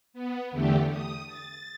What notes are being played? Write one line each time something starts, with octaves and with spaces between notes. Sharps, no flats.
B3
E2 D3 A3 G4
D#6
A6